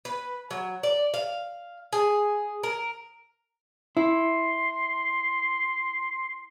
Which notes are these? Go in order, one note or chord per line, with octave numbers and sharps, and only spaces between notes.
B4
F#3
D5
F5
G#4
A#4
E4 C6